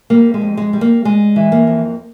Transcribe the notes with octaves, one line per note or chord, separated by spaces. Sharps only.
G3 A#3
G#3
F2
G#3
G3
A#3
G3 G#3
E3
A#3
F2